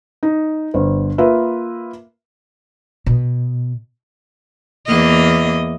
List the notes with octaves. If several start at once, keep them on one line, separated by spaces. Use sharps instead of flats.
D#4
G1 C5
A#3 F4 A#4 B4 E5
B2
E2 A#3 D#5